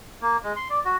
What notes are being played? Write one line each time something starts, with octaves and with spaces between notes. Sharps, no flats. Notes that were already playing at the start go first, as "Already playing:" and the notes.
A#3
G#3
C6
D5
F#4